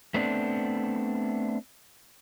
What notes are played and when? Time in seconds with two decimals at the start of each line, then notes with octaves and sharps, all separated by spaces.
0.14 A3 B3 C4 D4